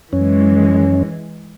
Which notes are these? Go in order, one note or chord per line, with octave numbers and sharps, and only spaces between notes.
F#2 E3 G#3 C#4